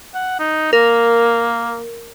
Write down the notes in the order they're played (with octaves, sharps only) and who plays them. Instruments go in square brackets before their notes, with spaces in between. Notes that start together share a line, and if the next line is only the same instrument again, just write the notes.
[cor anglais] F#5
D#4
[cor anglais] A#3 [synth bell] A#4